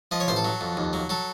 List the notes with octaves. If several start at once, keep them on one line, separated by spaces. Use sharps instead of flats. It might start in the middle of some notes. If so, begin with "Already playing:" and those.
F3 D#5
C#5
A1 C5
A4
F#3
F2
D#2
F#3
F#3 A4